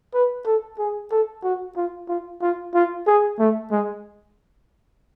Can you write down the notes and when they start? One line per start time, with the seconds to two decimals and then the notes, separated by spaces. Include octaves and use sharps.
0.14 B4
0.46 A4
0.79 G#4
1.11 A4
1.44 F#4
1.77 F4
2.08 F4
2.42 F4
2.74 F4
3.07 G#4
3.39 A3
3.71 G#3